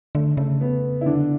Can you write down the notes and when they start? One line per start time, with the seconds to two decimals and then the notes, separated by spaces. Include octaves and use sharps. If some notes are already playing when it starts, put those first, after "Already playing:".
0.15 D3 A3
0.37 C#3 A3
0.61 B3
1.01 E4
1.06 D3 D4